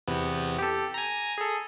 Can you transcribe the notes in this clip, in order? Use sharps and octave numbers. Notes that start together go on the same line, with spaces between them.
E2 C3 B3
G4 A4
G#5 A#5
G#4 A4